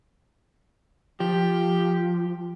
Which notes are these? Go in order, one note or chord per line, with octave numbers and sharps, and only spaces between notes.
F3 G4